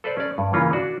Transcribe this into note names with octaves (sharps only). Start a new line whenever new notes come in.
A4 B4 C5 D5
C#4 D5
G2
C#3 E3 A#3 C#4 F4
D4 F#4 D5